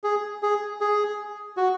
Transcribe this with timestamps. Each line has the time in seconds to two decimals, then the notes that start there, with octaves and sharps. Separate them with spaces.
0.04 G#4
0.43 G#4
0.81 G#4
1.57 F#4